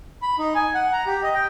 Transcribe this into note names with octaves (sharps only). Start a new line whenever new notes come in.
B5
D#4
G#5
F#5
A#5
G4
D#5
G5